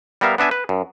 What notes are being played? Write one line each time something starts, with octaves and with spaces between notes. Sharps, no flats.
G3 B3 A#4 E5 F5
B3 D4 E5 G#5
B4
F#2